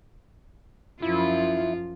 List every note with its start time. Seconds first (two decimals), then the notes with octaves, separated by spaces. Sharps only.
1.02 F#2 F3 E4 F4